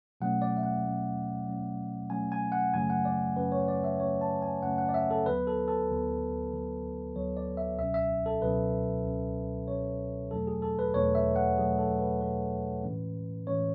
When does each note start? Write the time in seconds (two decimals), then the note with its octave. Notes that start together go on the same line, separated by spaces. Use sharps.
0.21 B2 F#3 A3 C#4 F#5
0.42 D5
0.57 E5
0.63 F#5
0.84 B2 F#3 A3 C#4
1.47 B2 F#3 A3 C#4
2.10 B2 F#3 A3 C#4 G#5
2.32 G#5
2.52 F#5
2.74 F#2 C#3 F#3 A3 C#4 G#5
2.90 F#5
3.05 D5
3.36 F#2 C#3 F#3 A3 C#4 B4
3.52 C#5
3.68 D5
3.84 E5
4.00 F#2 C#3 F#3 A3 C#4 C#5
4.21 A5
4.42 G#5
4.63 F#2 C#3 F#3 A3 C#4 F#5
4.78 F#5
4.89 D5
4.94 E5
5.11 A4
5.26 D2 D3 F#3 B3 B4
5.47 A4
5.68 A4
5.89 D2 D3 F#3 B3
6.52 D2 D3 F#3 B3
7.15 D2 D3 F#3 B3 C#5
7.37 D5
7.57 E5
7.78 C#2 B2 F#3 C#4 E5
7.94 E5
8.26 A4
8.42 C#2 B2 F#3 C#4 B4
9.05 C#2 B2 F#3 C#4
9.68 C#2 B2 F#3 C#4 C#5
10.31 E2 B2 F#3 A3 D4 A4
10.47 G#4
10.62 A4
10.79 B4
10.94 E2 B2 F#3 A3 D4 C#5
11.15 E5
11.36 F#5
11.57 E2 B2 F#3 A3 D4 G#4
11.78 A4
11.99 B4
12.21 E2 B2 F#3 A3 D4 B4
12.83 A2 E3 G#3 C#4
13.47 A2 E3 G#3 C#4 C#5